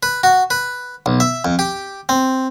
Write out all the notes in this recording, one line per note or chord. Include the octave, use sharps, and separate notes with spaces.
B4
F#4
B4
B1
E5
F2
G4
C4